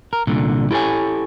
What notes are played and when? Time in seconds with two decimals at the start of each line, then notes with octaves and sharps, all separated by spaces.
0.13 A#4
0.27 C2 A#2 D3
0.71 E4 G4 A4 C#5 G#5